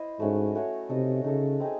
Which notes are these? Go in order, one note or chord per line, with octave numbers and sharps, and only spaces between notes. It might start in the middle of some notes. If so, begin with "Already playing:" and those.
Already playing: E4 C5 D#5
G#2 A3 C#4 F#4 C#5
A3 C#4 F#4 C#5
C3 D#4 A4 D#5
C#3 D#4 A4 D#5
C4 D#4 G#4